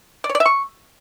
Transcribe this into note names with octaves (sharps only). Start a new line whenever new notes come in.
D5
C#5
D5
E5
C#6